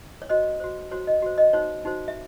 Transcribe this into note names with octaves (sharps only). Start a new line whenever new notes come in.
C#5
F#4 C5 D#5
F#4 C5
F#4 C5 C#5
D#5
F#4 C5
D#5
D#4 F#4 C5 C#5
D#4 F#4 C5
E5